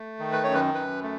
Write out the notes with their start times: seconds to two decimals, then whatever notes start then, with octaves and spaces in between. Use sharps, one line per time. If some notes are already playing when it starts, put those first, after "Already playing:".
Already playing: A3
0.19 D#3
0.32 B4
0.44 F#2 C#5
0.54 B4
0.74 F#2 B4
1.03 A3